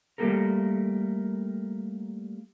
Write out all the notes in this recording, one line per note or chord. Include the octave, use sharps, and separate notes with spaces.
G3 A3 A#3 G4 A4 A#4